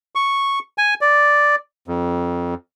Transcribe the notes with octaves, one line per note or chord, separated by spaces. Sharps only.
C#6
G#5
D5
F2